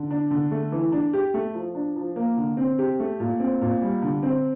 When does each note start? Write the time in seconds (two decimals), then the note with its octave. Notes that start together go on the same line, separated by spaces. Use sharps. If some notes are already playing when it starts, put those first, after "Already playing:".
Already playing: D3
0.10 D4
0.30 D3
0.51 A3
0.72 E3
0.92 D4
1.13 G4
1.34 A3
1.54 F3
1.75 D4
1.96 F3
2.16 A#3
2.37 D3
2.57 C4
2.79 G4
3.00 A3
3.20 A#2
3.40 C4
3.62 A#2
3.82 G3
4.02 D3
4.23 C4